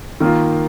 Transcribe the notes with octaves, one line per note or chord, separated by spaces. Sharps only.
D#3 A#3 F4